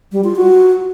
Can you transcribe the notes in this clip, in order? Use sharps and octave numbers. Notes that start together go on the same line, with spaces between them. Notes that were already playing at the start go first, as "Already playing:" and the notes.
G3
F4
F#4